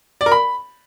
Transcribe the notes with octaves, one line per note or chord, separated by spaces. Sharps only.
D5
A#4
B5